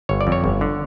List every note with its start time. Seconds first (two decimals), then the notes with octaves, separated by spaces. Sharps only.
0.09 G1 C#5
0.21 D5
0.27 F2
0.32 C#5
0.44 G1
0.61 D3